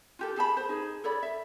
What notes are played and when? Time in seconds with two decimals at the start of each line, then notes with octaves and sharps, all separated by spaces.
0.19 F4 G4 A4
0.37 G#4 A5 B5
0.57 C5
0.69 D#4 G#4
1.04 A4 C#5 D5 B5
1.23 E5